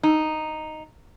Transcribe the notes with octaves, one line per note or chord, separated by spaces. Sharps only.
D#4